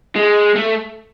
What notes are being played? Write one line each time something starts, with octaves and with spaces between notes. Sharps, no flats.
G#3
A3